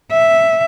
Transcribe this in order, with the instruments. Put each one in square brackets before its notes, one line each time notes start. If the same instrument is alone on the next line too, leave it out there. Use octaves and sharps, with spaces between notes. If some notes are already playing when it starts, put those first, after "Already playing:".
[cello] E5